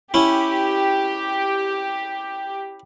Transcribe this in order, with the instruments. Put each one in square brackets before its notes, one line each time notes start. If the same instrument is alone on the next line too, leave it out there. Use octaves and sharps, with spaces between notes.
[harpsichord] C#4 E4 [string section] G4